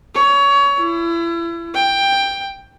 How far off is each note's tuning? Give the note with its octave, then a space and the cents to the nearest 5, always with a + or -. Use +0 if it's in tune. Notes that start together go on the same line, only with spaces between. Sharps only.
C#5 +25
E4 +35
G5 +10